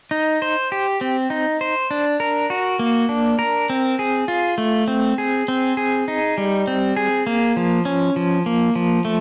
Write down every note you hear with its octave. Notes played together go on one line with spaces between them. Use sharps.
D#4
C5
G4
C4
D#4
C5
D4
A#4
F#4
A#3
D4
A#4
C4
G#4
F4
A3
C4
G#4
C4
G#4
D#4
G3
C4
G#4
A#3
F3
C#4
F3
A#3
F3
A3